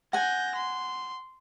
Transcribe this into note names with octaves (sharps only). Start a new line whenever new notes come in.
F#5 G#5 G6 A#6
C6